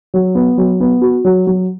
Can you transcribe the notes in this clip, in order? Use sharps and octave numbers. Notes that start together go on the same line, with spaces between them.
F#3
B3
F#3
B3
F#4
F#3
F#3